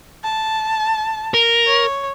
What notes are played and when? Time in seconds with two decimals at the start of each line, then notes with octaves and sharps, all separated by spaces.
0.24 A5
1.34 A#4
1.67 C#5